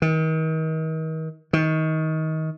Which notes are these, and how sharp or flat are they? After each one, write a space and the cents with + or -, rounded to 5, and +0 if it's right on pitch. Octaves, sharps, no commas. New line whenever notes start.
D#3 +40
D#3 +25